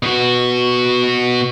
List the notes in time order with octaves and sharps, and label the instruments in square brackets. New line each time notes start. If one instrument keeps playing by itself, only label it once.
[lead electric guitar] B2 F#4